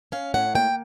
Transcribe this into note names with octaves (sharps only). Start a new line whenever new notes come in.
C#4 F5
A2 F#5
A#3 G5